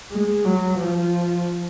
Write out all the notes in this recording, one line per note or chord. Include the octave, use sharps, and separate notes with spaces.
G#3
F#3
F3